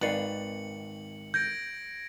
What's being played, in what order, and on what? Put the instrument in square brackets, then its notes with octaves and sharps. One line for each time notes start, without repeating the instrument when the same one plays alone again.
[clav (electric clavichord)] G#1 D#3 [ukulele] B4 D5 F5 [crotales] C#7 F#7
[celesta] G6 [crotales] G#6 A#6 D7